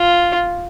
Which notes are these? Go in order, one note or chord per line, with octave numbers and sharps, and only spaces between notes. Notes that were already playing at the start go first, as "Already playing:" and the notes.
Already playing: F4